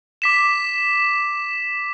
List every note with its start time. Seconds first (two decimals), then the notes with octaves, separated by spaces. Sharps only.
0.22 D6 B6 E7